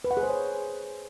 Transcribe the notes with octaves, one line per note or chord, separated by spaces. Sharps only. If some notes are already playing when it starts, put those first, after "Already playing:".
B4
F#5
G#4
C5
C#5